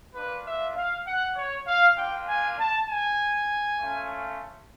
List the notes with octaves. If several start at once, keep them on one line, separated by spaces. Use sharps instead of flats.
A#3 D4 F4 B4
E5
F5
F#5
C#5
F5
A#3 D4 F4 G5
G#5
A5
G#5
A3 C#4 F4